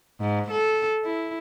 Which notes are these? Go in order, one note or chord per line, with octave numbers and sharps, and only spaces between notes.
G#2
A4
E4